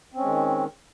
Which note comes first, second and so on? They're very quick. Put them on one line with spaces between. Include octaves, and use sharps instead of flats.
C4 C#4 G#3 D#3